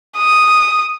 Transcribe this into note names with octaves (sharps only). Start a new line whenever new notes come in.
D#6